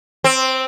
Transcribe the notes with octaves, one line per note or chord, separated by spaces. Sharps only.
C4